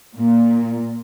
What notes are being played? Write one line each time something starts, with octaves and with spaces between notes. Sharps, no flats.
A#2